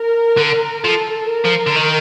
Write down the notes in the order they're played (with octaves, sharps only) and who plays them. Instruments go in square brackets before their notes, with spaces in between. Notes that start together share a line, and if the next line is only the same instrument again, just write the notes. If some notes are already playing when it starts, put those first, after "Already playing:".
Already playing: [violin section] A#4
[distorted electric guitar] D3
[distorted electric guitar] F3 [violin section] A4
[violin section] A#4
[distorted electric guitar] F3
D3
D#3